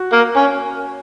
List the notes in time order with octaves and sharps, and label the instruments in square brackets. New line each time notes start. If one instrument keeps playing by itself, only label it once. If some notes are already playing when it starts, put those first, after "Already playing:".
Already playing: [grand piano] F#4
[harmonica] A#3
C#4